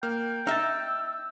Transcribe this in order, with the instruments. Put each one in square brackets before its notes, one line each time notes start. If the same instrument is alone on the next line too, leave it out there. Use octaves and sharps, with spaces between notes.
[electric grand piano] A#3 F6 [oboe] G5
[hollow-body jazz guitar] D#4 E5 [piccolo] E6 [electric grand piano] F6 A6